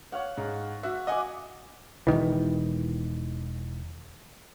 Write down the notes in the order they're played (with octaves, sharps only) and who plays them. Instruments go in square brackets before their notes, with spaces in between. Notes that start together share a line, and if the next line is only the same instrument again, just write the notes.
[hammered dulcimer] C#5 F5 F#5
[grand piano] G#2
[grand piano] F#4 [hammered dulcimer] E5
[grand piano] D#5 F#5 G#5 [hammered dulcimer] E5 D6
[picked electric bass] E1 D2 D#3 E3